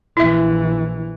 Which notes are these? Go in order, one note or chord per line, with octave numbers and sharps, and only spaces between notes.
A#1 E3 E4 E5